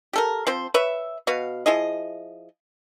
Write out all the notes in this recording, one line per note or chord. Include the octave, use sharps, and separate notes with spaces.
G4 A4 A#4
F3 C4 C5
B4 C#5 E5
B2 F#4 B4 F5
F3 E4 G#4 D#5